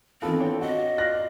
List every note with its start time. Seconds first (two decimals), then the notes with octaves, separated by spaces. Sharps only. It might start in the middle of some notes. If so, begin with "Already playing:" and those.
0.22 D#3 E3 B3 C4 F4 A4
0.40 D4 C#5 G5
0.61 F#4 D#5
0.98 F4 D5 F5 F#6 A#6